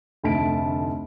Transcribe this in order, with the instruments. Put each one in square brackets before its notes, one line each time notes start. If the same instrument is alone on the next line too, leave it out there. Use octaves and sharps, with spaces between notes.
[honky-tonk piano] F1 D2 D#3 A5 B6 D7